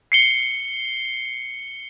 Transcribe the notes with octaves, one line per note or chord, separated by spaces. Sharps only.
C7 C#7 G7